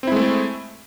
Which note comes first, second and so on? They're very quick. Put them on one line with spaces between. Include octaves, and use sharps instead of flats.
C4 E4 G#3 A3